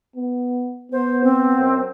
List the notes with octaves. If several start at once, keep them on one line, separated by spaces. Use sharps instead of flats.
B3
B3 C5
C4
F#2